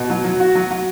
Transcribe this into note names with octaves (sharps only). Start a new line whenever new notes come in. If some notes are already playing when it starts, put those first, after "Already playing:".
Already playing: B2
F#3
F#3
F#4
F#3
F#3